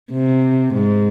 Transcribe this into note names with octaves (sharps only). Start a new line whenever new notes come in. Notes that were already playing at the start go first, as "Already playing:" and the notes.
C3
G#2